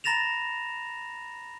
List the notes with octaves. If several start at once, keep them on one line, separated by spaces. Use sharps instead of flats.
A#5 B5 A6 A#6 E7 F7